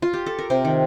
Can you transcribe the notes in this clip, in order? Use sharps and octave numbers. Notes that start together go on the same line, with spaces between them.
F4
G4
A4
A#4
C3 C5
D#3